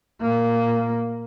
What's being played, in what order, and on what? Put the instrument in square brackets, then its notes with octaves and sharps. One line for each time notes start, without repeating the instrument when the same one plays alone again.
[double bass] A#2 A#3